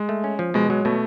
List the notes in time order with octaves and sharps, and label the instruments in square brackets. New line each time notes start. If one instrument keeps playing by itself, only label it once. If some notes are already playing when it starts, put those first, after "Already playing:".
Already playing: [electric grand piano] G#3
[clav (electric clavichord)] A3
C#4
F3
[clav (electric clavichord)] B2 [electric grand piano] G#3
[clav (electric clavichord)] F#3 [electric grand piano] G#3
[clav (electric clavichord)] B2 [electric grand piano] A3